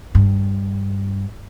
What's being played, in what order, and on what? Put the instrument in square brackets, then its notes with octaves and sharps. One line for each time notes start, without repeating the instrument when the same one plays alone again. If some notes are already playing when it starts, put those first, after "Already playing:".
[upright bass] G2